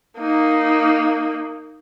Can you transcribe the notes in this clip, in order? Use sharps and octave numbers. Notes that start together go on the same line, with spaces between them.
A#3 D#4